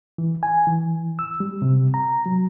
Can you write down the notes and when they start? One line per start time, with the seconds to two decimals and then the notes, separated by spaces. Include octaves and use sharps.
0.18 E3
0.43 G#5
0.67 E3
1.19 E6
1.40 G3
1.62 C3
1.94 A#5
2.26 F#3